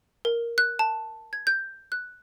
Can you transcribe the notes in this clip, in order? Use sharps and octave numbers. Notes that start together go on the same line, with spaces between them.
A#4
F#6
A5
G#6
G6
F#6